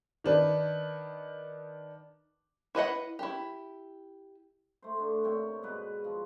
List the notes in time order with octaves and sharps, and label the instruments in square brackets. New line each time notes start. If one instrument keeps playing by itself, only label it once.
[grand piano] D#3 D4 B4
[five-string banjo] E4 B4 D#5 F#5
E4 G4
[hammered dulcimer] A3 C5
D3 A3 D4
C3 A#3 C#5 G5
G#2 B2 B4
F3